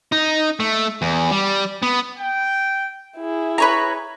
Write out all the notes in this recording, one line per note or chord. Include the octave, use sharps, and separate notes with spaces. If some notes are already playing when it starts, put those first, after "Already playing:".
D#4
A3
E2
G3
B3
G5
E4 G#4
B4 C#5 A#5